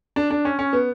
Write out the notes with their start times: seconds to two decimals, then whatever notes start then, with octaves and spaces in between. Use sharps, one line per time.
0.16 D4
0.31 D4
0.45 C#4
0.59 C#4
0.73 B3